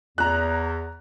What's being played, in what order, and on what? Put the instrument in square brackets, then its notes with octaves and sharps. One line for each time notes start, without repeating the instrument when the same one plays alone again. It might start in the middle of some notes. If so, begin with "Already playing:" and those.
[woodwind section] E2 [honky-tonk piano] A#5 F#6